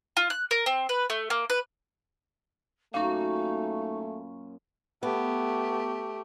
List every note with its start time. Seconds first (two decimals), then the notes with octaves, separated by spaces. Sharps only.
0.17 F4
0.30 F#6
0.51 A#4
0.66 C4
0.89 B4
1.10 A3
1.30 A#3
1.50 B4
2.94 F#2 A#2 A3 C#4 D#4 F5 C#6
5.03 A3 B3 G4